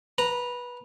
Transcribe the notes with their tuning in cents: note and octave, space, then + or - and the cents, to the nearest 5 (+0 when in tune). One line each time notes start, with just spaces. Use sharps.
B4 -15 A#5 +0